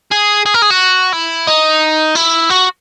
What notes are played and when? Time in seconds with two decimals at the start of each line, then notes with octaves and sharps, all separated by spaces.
0.11 G#4
0.46 G#4
0.54 A#4
0.62 G#4
0.71 F#4
1.13 E4
1.47 D#4
2.16 E4
2.50 F#4